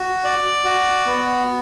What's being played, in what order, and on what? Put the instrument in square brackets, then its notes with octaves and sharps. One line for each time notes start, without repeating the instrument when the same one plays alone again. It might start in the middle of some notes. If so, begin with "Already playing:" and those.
Already playing: [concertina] F#4
D5
F#4
B3